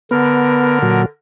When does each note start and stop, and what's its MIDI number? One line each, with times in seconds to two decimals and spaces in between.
0.11 1.02 50
0.11 0.79 59
0.11 1.02 70
0.82 1.06 46
0.82 1.06 54